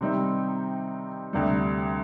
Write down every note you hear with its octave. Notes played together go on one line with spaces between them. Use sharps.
C3 D#3 G3 C4 D#4
D2 C3 G3